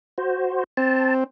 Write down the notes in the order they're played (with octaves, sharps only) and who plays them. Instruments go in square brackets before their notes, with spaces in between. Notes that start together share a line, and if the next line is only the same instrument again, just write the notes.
[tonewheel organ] F#4 C5
[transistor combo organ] C4 [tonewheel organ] A5